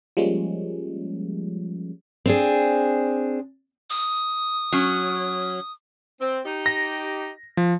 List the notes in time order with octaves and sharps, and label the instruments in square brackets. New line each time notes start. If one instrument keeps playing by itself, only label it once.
[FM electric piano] F3 G3 G#3 A#3 C#4
[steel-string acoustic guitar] C4 D4 G#4
[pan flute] D#6
[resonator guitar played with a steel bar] F#3 C#4
[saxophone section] C4
D#4 G4
[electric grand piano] A#6
F3